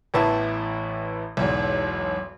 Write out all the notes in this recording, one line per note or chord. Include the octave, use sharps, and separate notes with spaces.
A1 A2 E3 B3 E4 A5
B1 E2 G#2